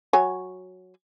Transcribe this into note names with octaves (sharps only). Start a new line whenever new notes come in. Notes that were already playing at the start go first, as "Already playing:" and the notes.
F#3 C#5 G#5